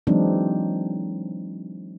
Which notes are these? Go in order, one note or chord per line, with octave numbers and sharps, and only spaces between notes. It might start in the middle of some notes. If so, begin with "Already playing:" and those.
E3 F#3 G#3 C4 D4 D#4